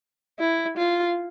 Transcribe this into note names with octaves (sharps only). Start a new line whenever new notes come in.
E4
F4